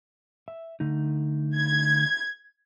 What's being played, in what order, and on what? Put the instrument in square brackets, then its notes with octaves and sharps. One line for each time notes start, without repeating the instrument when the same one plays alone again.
[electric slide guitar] E5
D3 A3 D#4
[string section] G#6